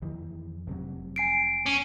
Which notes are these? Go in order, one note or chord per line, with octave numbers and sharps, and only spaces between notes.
F2 D#3 E3
F1 C3 F#3
G#5 C7 D7
C#4